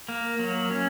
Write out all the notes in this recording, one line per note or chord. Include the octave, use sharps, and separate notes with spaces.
A#3
F#3
C#4